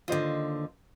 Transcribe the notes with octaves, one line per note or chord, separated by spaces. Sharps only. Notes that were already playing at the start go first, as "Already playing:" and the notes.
D#2 D3 F4 C5 D#5